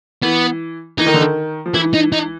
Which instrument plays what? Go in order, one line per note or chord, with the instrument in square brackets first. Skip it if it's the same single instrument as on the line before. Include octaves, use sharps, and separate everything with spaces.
[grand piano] E3 [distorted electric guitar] B3
[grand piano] E3 [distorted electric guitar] D#4
[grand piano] D#3
D3
D#3
F3
[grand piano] E3 [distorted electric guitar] E4
[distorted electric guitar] D#4
D#4